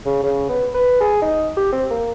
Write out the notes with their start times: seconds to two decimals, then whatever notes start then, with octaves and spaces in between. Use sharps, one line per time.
0.06 C#3
0.23 C#3
0.49 B3
0.74 B4
1.00 G#4
1.22 D#4
1.57 G4
1.73 C4
1.91 A#3